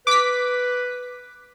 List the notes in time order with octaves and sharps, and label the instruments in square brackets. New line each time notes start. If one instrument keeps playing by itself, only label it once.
[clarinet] B4 [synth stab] D6 B6